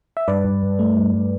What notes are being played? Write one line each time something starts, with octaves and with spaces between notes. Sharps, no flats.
E5
G2 B4 D5
G2
G2
A3
G2
G2